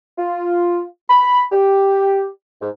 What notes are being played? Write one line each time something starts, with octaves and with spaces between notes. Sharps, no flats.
F4
B5
G4
G#2